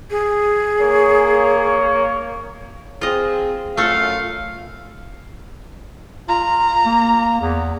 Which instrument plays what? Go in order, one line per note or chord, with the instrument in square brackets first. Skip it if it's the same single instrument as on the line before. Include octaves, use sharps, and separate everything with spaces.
[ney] G#4
[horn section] A#3 C#5
[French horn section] C4 G#4 [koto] F4 D#5
[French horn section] F#2 F4 [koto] A3 A4 [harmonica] F5
[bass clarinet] F4 [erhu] A#5
[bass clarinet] A#3
E2